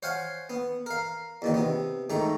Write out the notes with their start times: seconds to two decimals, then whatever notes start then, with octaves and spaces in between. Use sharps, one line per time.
0.03 C5 C#5 F5 F#5 G#5
0.50 B3
0.86 A#4 F5
1.42 E2 A#2 D#3
1.54 C3 B3
2.10 G#2 D#3 A3 A#5